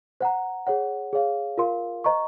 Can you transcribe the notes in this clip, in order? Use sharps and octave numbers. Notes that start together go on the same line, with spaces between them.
C5 F#5 A#5
G#4 C#5 F#5
G#4 C#5 F5
F4 A#4 F5 C6
C5 D#5 A#5 C#6